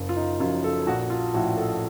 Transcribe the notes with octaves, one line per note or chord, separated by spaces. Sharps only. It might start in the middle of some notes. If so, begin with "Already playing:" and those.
Already playing: F#1
F4
D#4
F#2 F3 F4
A4
A#1 F#4
F4
A2 F3 F#4
A4